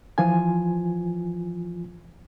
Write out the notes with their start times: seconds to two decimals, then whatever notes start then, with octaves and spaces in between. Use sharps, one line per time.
0.18 E3 F3 F4 G#5